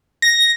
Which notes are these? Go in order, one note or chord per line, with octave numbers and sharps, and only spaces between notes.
A#6